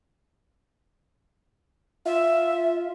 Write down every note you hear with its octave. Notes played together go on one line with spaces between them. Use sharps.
F4 E5